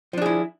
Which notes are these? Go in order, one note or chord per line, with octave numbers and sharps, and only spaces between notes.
F3 D4 E4 G#4